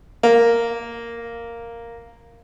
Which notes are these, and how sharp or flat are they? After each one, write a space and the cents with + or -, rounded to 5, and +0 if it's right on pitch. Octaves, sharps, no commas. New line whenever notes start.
A#3 -5